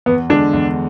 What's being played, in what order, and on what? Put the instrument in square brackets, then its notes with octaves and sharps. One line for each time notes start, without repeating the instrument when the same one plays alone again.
[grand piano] E2 [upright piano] B3
[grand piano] D3 G#3 [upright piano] D4
[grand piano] E2